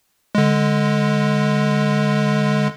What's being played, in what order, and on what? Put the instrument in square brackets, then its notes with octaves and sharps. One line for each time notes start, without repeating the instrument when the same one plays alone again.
[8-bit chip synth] D3 G#3